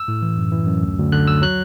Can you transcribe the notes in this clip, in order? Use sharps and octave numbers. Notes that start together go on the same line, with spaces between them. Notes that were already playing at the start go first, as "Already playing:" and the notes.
Already playing: E6
A2
E3
F#2
E3
F#2
D2
D2
D3 F#6
F#3 E6
F#3 F#6